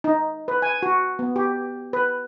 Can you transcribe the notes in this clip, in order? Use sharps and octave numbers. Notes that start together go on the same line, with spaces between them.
D#4
B4
G#5
F#4
B3
G4
B4